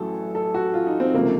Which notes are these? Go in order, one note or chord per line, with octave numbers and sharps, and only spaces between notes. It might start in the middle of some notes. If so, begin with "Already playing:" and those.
Already playing: A1 A2 F#3 A3 A4
A4
F#4
F4
D#4
C4
C#2 C3 F3 A3 A#3